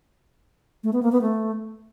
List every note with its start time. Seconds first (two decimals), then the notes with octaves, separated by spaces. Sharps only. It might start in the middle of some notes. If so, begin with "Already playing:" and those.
0.84 A3
0.93 B3
1.03 A#3
1.12 B3
1.22 A3